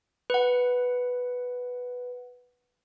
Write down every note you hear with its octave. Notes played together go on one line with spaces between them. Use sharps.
B4 F#5